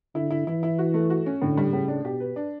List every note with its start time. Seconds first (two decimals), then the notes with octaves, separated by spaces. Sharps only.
0.15 D3 E4
0.31 E4
0.47 E3 E4
0.63 E4
0.79 F#4
0.94 A3
1.10 F#4
1.26 C#4
1.42 A2 D3
1.57 G3
1.73 A2 C#3
1.88 D4
2.04 B2 G4
2.20 B4
2.36 D4